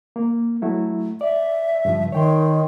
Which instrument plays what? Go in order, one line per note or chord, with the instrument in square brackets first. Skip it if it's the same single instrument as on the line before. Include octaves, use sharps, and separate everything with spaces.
[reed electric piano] A#3
F#3 A3 E4
[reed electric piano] D5 [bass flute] E5
[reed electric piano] G2 C#3 F3
[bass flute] D#3 [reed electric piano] C#5 G5 C6